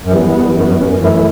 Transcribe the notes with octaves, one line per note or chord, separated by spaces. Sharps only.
F#2
E2 E3 G3 B3
E2
F#2
F#2
F#2
F#2
F#2 E3 A3 E4